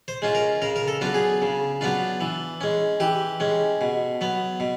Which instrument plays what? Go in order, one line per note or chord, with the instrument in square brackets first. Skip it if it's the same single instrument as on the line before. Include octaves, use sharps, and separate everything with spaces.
[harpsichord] C5
G#3 C#4 F4
A#4
C#3 A#4
A#4
A4
F#3 B3 D4 F4
G#4
C#3
F#3 B3 D4 F4
E3
G#3 C#4
E3 G4
G#3 C#4
B2
F#3 B3
B2